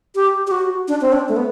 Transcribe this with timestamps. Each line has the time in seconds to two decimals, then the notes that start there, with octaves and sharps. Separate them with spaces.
0.15 G4
0.47 G4
0.51 F#4
0.88 D4
1.01 C4
1.13 D4
1.29 A3
1.36 B3